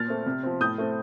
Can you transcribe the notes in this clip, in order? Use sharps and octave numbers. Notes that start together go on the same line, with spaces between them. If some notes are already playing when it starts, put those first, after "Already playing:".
Already playing: A#2 F6 A6
A3 C4
C3
F3 C4
A2 D#6 G6
A3 C4